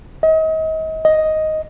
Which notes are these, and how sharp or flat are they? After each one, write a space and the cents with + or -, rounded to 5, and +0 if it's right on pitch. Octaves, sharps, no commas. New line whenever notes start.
D#5 +35
D#5 +5